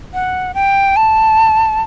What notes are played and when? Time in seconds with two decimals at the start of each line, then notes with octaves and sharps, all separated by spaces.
0.14 F#5
0.54 G5
0.96 A5